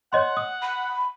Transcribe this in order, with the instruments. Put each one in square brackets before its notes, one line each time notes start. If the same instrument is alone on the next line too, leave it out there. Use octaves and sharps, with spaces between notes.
[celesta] C#5 D#5 C6 [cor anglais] F#5
[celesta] D#6
[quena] B5